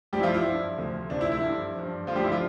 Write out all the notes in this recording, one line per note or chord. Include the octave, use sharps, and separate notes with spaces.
G2 F3 G3 G4
E4
F3 F4
E4
G2 F3
D2 C3 F3
D2 C3 F3 D4
E4
E4
G2 F3
G2 F3
G2 D3 F3 F4
G3 G4
E4
F3 F4